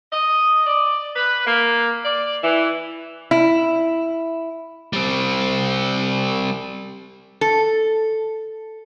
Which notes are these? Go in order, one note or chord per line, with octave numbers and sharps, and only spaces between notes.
D#5
D5
B4
A#3
D5
E3
E4
G3 C4
A4